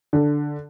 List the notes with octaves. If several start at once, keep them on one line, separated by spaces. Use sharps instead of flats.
D3